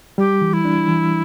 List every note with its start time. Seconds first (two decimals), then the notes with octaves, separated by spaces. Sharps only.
0.18 G3 G4
0.41 E3
0.53 E4
0.65 D4
0.88 E3